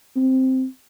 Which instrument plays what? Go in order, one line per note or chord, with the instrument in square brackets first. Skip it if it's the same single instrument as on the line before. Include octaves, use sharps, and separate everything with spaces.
[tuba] C4